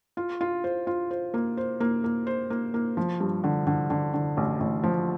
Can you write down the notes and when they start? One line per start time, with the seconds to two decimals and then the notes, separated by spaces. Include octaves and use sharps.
0.17 F4
0.41 F4
0.64 C5
0.87 F4
1.11 C5
1.34 A#3
1.57 C5
1.80 A#3
2.04 A#3
2.27 C5
2.50 A#3
2.74 A#3
2.97 F3
3.20 G2
3.44 D3
3.67 D3
3.90 D3
4.13 D3
4.37 A1
4.60 A1
4.84 F3